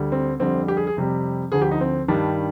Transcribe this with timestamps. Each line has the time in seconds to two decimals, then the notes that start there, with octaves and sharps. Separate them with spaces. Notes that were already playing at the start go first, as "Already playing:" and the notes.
Already playing: D2 D3 G3
0.12 C4
0.39 F2 D3 G3 C4
0.68 G4
0.77 G#4
0.87 G#4
0.96 F2 C3 G3
1.52 D2 D3 F3 G#4
1.62 G4
1.71 D#4
1.81 C4
2.08 G2 D#3 G3 D4